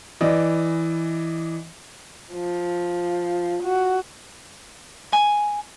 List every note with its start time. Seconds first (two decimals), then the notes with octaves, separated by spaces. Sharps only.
0.21 E3 D5 D#5
2.32 F3
3.63 F#4
5.13 G#5